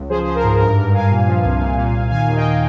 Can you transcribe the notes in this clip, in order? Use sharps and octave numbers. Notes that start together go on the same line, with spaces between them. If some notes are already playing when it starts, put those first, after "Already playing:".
Already playing: C#2
F3 G#4 C5
G#4 C5
F3
A#4
G#2 G#4
G2 A#4
G2 A#4
G2 F5 G#5
A#2
F3
C2
A#2
A#2
A#2
D#3 F5 G#5
D#2
D#5 G5
D#3